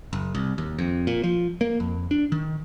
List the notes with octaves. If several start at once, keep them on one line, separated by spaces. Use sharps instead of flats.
F#1
C2
D#2
F2
A#2
F3
A#3
F2
D4
D#3